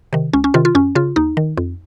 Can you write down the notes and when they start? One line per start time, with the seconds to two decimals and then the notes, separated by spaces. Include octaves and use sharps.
0.13 C3 D#3
0.33 C#2 C#4
0.44 C#4
0.54 C3 D#3 F4
0.65 F4
0.75 F#2 C#4
0.95 C#3 F4
1.16 D#2 D#4
1.37 D#3
1.57 F2